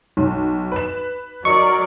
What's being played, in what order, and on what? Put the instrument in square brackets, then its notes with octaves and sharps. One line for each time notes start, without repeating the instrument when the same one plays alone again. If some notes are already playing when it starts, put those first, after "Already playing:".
[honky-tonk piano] B1
B4 E7
[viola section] F#3 A#4 D5 [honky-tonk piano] D#5 [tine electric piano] C#6